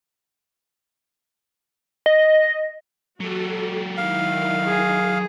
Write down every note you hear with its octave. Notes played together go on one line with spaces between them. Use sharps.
D#5
F#3 F#4 G4 A4
D#3 E4 F5
G#4